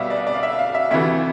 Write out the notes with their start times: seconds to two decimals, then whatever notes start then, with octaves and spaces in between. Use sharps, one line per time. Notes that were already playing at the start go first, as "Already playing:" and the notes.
Already playing: B1 B2 G3 B3 D5 E5 F5
0.10 D5
0.27 D5
0.34 F5
0.43 E5
0.59 F5
0.75 E5
0.91 D2 C3 E3 A3 E5